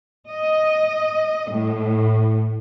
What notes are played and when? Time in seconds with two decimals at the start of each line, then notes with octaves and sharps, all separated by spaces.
0.29 D#5
1.50 A2